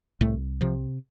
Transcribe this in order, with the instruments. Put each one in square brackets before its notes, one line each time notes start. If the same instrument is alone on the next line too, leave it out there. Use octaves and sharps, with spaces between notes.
[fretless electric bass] C2 A2 A3
C3 F3